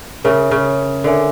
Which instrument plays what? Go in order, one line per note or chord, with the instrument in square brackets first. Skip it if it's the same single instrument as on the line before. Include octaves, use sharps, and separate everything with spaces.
[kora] C#3 [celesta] A#4 C#5 E5 G#5
[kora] C#3
[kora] D3 [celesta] A#4 C#5 E5 G#5